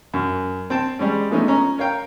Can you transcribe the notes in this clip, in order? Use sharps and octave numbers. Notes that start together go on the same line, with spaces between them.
F#2
C4 G5 A5
G3 G#3 C#4
F3 G#3 A3 B3 C#4 D#4
C#4 C#5 A#5
A#4 C#5 F5 G5